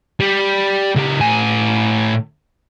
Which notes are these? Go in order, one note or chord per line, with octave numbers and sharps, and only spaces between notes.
G3
C#2 G4
A2 G#5